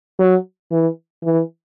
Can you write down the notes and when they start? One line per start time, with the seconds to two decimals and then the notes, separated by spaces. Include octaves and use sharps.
0.19 F#3
0.71 E3
1.24 E3